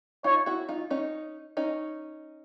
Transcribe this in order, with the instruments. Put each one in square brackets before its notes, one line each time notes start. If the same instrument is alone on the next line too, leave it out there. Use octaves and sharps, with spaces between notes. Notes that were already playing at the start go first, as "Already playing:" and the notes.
[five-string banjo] D#4 F4 [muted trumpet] C#5
[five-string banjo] E4 F#4
D#4 F4
C#4 D#4
C#4 D#4